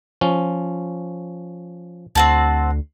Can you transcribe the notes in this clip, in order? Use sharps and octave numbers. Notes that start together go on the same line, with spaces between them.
F3 C#4
D2 C4 F#4 A5